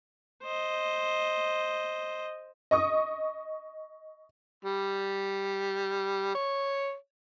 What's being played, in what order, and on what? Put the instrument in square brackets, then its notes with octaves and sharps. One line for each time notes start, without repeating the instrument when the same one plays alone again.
[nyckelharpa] C5 D#5
[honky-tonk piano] D#5 C#6 D#6
[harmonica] G3
C#5